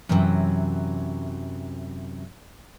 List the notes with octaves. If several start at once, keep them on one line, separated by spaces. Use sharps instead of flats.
F#2 C3 E3 F#3